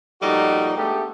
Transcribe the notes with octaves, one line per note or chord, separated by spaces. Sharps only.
A#2 F3 G3 A3 D#4 F#4
G#3 A3 B3 D4 G4